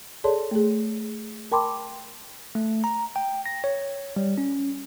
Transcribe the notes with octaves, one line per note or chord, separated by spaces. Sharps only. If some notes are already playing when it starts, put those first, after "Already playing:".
G#4 A4 C#5 D5 A5 C6
A3 G#4
A#4 G5 A5 B5 C6 D6
A3
A#5
G5
A#6
C#5
G3
C#4